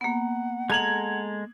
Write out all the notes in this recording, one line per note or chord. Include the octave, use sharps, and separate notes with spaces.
A#3 B3 F#5
G#3 A4 A#5 G#6 F#7